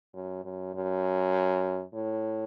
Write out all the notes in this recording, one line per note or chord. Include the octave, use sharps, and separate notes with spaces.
F#2
F#2
F#2
A2